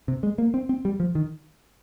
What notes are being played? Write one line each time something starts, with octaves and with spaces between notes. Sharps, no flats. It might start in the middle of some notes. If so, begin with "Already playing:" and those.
C3
G#3
A#3
C4
C4
G3
F3
D#3